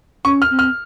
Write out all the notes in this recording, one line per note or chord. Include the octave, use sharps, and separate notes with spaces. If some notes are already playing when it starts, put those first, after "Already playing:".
C#4 C#6
F6
C4
F6